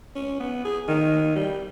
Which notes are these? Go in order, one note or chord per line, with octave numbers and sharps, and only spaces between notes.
C#4
B3
G#4
D#3
G3